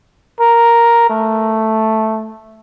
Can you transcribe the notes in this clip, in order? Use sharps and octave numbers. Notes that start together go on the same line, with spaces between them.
A#4
A3